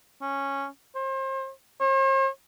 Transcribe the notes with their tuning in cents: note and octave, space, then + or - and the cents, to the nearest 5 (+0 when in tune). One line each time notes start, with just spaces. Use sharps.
C#4 -5
C5 +35
C5 +45